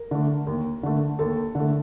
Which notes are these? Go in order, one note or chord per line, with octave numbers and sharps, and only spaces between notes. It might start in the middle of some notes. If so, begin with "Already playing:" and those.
Already playing: A#4
D3 A3
D#2
D3 A3
D#2 A4
D3 A3